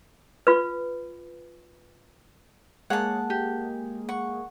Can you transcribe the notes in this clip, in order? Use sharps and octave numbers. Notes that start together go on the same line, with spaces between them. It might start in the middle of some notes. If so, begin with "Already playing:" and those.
F4 B4
G#3 A#3 G#4 C#5 F#5 A5
G4
F#5 C#6